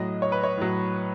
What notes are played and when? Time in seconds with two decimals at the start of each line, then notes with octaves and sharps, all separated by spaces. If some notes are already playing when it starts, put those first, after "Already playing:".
Already playing: A2 F#3 D#5
0.22 C#5
0.32 B4
0.43 C#5
0.57 A2 F#3